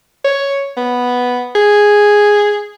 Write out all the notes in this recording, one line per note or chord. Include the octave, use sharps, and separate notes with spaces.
C#5
B3
G#4